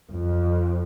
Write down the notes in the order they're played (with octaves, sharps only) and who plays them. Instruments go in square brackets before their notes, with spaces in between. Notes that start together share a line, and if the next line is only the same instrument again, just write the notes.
[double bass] F2